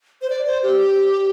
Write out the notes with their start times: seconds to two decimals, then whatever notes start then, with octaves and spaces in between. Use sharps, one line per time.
0.22 C5
0.30 D5
0.47 C5
0.63 G4